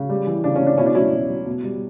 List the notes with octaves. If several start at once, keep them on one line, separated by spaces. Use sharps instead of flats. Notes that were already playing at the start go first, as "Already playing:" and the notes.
Already playing: C#3
G3
E3
C#3 D4
C#4
C#3
D4
B2 C#4 E4
D4
F#3 C#4 E4
B2
F#3
B2
G3